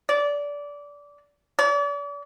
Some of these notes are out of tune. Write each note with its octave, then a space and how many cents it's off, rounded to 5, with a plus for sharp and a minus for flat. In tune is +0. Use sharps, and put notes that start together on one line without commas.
D5 -20
D5 -40